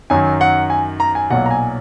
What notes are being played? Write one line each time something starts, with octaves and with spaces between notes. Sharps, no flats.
F#2 D#3 F#3 G#5
F#5
G#5
A#5
G#5
B1 A#2 F#3 F#5
A#5
G#5